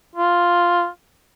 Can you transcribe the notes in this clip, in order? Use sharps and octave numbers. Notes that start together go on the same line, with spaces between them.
F4